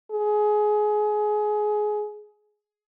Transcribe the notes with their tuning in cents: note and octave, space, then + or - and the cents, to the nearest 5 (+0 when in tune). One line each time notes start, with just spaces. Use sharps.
G#4 +20